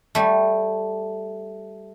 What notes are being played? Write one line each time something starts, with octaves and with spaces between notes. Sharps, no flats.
G3 A3